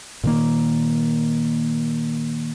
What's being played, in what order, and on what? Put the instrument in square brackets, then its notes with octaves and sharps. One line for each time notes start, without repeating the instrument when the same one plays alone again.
[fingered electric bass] A#2 D#3 A#3